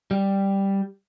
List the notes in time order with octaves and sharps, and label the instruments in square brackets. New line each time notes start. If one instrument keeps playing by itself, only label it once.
[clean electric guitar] G3